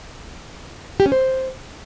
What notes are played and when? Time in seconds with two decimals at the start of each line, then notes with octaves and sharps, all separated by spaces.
1.00 G4
1.06 C#4
1.12 C5